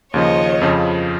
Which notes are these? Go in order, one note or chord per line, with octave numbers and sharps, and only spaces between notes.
D#2 C#3 F3 C#5 D#5
F2 C#3 F3